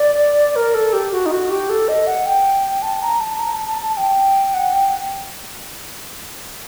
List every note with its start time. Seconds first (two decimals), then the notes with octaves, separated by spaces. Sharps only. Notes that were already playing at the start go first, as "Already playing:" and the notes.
Already playing: D5
0.56 A#4
0.74 A4
0.93 G4
1.12 F#4
1.26 D#4
1.32 F#4
1.50 G4
1.70 A4
1.88 D#5
2.07 F#5
2.26 G5
2.82 A5
3.02 A#5
3.20 A5
3.40 A#5
3.53 A5
3.68 A5
3.82 A5
3.97 G5
4.54 F#5
4.73 G5